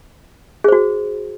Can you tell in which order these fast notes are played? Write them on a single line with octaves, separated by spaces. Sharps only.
G#4 C5 F#4